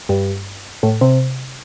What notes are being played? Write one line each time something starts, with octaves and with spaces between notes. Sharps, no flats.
G2
A2
C3